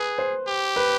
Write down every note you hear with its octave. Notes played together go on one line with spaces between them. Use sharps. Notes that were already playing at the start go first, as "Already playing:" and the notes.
Already playing: G#4 B4
C5
G4
B4